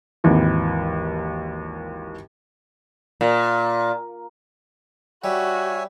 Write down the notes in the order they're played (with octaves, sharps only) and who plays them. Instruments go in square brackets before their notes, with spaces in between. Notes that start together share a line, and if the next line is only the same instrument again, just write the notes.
[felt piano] G#1 D#2 E3
[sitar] A#2
[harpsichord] G3 [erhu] F#4 [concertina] C#5 E5 G#5